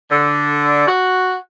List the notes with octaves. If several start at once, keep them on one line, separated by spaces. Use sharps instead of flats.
D3
F#4